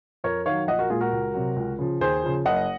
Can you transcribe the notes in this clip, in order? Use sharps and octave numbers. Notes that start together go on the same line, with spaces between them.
F2 A#4 C#5
D#3 F#3 C#5 F5
A#1 D#5 F#5
F#4 A#4
A#2 G#3 F4 G#4
F#4 A#4
C#2
C3 F#3
C#2
C#3 F3
D#2 G#4 C5
C#3 F3
F#1 D#5 F#5